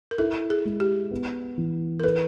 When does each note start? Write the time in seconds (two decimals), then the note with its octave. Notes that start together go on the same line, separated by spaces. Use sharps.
0.11 A#4
0.18 E4 A4
0.50 G#4
0.65 G#3
0.80 G4
1.11 B3
1.58 E3
2.00 A#4
2.04 A4 B4